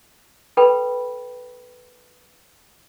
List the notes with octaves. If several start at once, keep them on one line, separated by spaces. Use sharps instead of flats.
A4 B4 G5 B5